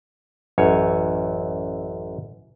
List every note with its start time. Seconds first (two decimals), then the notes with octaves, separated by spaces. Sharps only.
0.58 A1 F#2 C#5